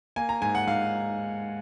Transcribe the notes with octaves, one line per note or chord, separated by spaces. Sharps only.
A#3 G#5
A#5
G#2 G#5
F#5
G#2 F5